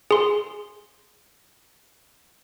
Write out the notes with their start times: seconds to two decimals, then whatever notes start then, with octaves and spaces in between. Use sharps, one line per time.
0.11 G#4 C6